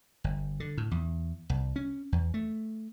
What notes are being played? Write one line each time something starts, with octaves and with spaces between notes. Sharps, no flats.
G1
D3
A2
E2
C2
C#4
E2
A3